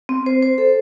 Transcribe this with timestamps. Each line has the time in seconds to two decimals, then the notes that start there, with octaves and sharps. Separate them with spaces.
0.09 C4
0.26 C5
0.43 C5
0.58 A4